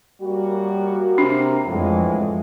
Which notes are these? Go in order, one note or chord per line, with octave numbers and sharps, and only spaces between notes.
F#2 G3 A#3 F#4
C3 A#3 D4 A#4
F2 A2 E3 G#3 F4